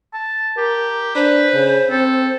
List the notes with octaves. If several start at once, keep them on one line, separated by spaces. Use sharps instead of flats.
A5
G4 A#4
D4 B4 C5
C#3
C4 A4